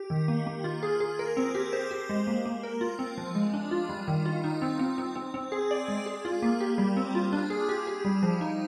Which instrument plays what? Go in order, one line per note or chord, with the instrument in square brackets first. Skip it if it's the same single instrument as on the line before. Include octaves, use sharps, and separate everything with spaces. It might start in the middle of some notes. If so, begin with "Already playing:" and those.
Already playing: [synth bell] G4
D#3
A#3
A#3
F4
G#4
G#4
A#4
C4
G4
C5
G4
G#3
A#3
A#3
A#4
F4
C4
F3
G#3
D4
F4
G3
D#3
F4
D#4
C4
C4
C4
C4
C4
G#4
D5
G#3
G#4
F4
A#3
G4
G3
C4
F4
D4
G#4
G4
G4
G3
F3
D#4